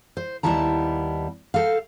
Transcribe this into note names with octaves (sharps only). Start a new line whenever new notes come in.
C5
D#2 G3 B3 E4 A5 A#5
A4 C5 F5